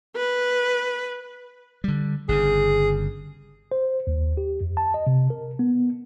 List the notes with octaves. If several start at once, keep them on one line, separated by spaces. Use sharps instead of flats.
B4
D3 G3
G1 G2 C#3 G#4
C5
D#2
G4
F2
A5
D#5
C3
A#4
B3